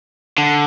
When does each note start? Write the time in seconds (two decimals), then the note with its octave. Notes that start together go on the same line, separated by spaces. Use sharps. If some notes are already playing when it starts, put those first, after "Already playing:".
0.38 D3